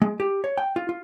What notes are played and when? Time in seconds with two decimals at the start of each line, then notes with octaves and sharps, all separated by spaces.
0.02 G#3
0.20 G4
0.44 C#5
0.58 G5
0.76 F4
0.89 F4